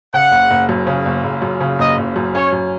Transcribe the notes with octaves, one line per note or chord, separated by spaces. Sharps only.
C#3 F#5
F#1
F#1
F#2
C#3
F#1
F#1
F#2
C#3
F#1 D#5
F#1
F#2
C#4 C#5
F#2